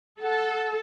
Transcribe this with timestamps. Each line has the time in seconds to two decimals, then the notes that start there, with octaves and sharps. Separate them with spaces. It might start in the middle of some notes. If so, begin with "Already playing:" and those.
0.22 A4 F#5